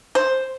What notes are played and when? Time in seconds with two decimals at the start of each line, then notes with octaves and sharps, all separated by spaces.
0.15 C5